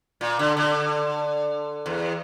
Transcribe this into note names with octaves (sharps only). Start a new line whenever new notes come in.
A#2
D3
D3
E2